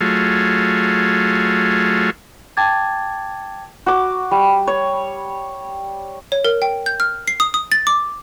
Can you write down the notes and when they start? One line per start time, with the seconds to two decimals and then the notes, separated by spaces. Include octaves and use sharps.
0.01 F#3 A3 F4 G#4
2.57 G5 A5 D6 G#6 A6
3.86 F#4 D6
4.31 G3
4.67 C#5
6.32 C#5
6.45 A#4
6.62 G5
6.86 G6
7.00 F6
7.28 C7
7.40 D#6
7.54 D#6
7.72 A6
7.87 D6